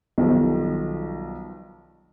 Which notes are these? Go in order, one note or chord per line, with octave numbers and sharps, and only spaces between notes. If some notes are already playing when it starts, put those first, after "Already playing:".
B1 B2 D#3 F3 G3